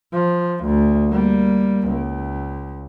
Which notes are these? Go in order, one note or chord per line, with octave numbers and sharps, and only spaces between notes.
F3
D2
G3 A#3
C#2